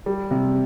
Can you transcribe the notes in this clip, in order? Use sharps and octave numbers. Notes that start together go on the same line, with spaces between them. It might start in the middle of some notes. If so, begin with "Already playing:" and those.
G3
C3